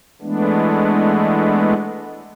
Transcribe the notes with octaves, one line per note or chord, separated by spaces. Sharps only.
E3 G#3 A3 B3 D4